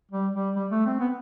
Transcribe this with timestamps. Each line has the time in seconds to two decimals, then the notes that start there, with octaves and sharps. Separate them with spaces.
0.11 G3
0.34 G3
0.55 G3
0.71 A3
0.86 C4
1.00 B3